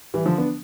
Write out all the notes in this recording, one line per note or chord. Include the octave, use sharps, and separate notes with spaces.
E3 G3
D3 F3
B3 D4